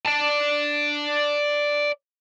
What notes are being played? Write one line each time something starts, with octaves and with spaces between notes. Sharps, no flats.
D5 A5